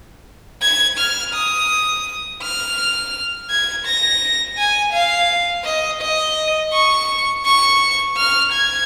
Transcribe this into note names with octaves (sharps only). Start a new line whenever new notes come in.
G#6
F6
D#6
F6
G#6
A#6
G#5
F5
D#5
D#5
C#6
C#6
F6
G#6